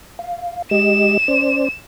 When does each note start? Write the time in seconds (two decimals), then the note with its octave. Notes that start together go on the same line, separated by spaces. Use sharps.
0.19 F5
0.71 G#3 G4 D#5 E7
1.28 C#4 C5 D5